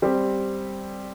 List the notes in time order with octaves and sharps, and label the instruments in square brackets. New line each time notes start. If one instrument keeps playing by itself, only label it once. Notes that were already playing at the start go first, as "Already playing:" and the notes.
[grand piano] G3 C4 G4